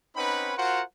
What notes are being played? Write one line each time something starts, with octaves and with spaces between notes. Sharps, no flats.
C4 C#4 D#4 B4 F#5 B5
F4 F#4 A#4 C5 F#5